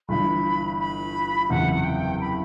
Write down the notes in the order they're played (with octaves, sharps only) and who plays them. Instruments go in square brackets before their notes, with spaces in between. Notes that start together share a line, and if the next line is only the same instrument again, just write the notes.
[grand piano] G1 G2 E3 [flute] B5
[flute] B5
[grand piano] F#1 E2 C3 [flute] F#5
[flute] G5
B5